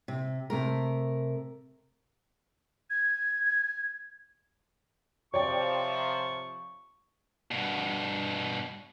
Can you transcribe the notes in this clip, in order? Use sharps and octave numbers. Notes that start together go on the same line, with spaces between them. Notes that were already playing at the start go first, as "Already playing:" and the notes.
C3
C3 A3 A#4
G#6
C3 F3 C#5 D5 G5 C#6
G2 B2